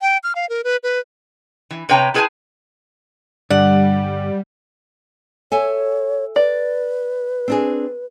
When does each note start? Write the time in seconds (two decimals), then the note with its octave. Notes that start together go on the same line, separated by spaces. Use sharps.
0.02 G5
0.24 F6
0.36 F5
0.49 A#4
0.64 B4
0.83 B4
1.71 E3
1.89 C3 B4 C#5 G5 A5 A#5
2.14 E4 G#4 B4 C5 G#5 A5
3.50 G2 D3 G3 D5 F#5
5.52 A4 C#5 E5 G#5
6.36 B4 D5
7.48 C4 D4 G#4